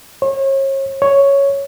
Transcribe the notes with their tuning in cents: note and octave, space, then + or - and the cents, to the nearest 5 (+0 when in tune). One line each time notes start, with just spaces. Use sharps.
C#5 -40
C#5 +0